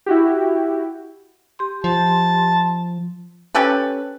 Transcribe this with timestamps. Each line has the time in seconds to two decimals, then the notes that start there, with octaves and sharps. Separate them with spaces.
0.06 E4 F#4 G4
1.59 G4 C6
1.84 F3 A5
3.55 C#4 G4 A4 B4